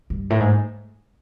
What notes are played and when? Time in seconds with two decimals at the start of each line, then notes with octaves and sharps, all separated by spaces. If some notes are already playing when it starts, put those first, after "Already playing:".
0.10 G2
0.30 A2
0.40 G#2